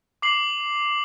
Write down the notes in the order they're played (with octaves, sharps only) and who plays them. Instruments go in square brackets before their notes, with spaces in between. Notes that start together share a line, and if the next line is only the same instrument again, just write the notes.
[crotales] D6 C7 F#7